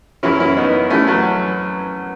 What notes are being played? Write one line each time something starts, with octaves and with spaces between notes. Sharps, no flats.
F#2 E3 C#4 E4
C#4 E4
B3 D#4
F#2 E3 A3 C#4
F#3 A3